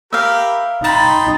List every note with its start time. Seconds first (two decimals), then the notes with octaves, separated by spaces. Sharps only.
0.13 G4 A#4 E5 F5 B5
0.84 D#4 G5 B5 C6 A6